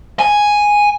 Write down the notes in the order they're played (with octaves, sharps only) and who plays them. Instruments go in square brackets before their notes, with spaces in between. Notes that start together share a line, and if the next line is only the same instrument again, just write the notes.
[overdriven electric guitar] G#5